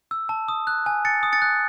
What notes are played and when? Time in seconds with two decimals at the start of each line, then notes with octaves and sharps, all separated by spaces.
0.11 E6
0.29 A5
0.48 D#6
0.67 F#6
0.86 G#5
1.05 G#5 A6 C#7
1.23 D#6
1.33 A6 C#7
1.42 F#6